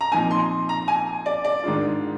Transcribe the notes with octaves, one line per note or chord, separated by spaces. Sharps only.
A#5
A#2 F3 C4 D#4 G#5
C6
A#5
G#5
D5
D5
G#2 D#3 G#3 D4 F4